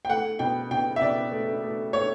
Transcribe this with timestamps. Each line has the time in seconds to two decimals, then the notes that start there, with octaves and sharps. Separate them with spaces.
0.05 G5
0.09 A3 F#5
0.39 B2 G5
0.71 B2 G5
0.96 E5
1.01 B2 D5
1.32 A3
1.63 A3
1.93 A3 C#5